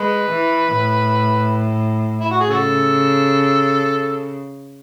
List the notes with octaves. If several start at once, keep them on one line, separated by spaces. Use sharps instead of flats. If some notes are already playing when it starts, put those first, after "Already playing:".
Already playing: G#3 B4
E3
A2
E4
F#4
G#4
C#3 F#4 A4